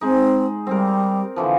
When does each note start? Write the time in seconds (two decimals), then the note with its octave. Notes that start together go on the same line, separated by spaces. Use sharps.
0.01 G#3 C4 D#4
0.67 G3 C4 A#4
1.36 D3 E3 F3